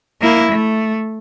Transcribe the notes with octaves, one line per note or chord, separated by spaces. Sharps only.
A#3 E4
A3